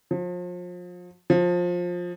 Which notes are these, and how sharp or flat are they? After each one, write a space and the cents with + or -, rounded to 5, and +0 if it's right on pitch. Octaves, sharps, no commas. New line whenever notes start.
F3 +35
F3 +20